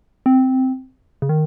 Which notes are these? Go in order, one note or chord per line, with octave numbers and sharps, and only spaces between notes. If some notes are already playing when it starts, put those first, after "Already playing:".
C4
C#3
D#3